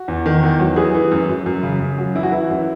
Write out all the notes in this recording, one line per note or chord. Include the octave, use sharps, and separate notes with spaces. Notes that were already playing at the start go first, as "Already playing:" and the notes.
Already playing: F#4
E2
D#3
E2
F#3
E3 G#4
E3
F#2
F#2
F#2
C#3
F#2
F#3
E3 E4
F#4
E3 E4
F#2